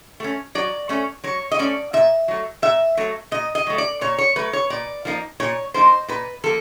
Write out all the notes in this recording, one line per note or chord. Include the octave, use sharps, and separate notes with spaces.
A3 C#4
F#3 D5
A3 C#4
F#3 C#5
D#5
A3 C#4 D5
A#2 E5
F#3 A3
A#2 E5
F#3 A3
A#2 D#5
D#5
F#3 A3
D5
A#2 C#5
C#5
F#3 A3 B4
C#5
A#2 D5
F3 A#3 D#4
A#2 C#5
F3 A#3 D#4 C5
A#2 B4
F3 A#3 A4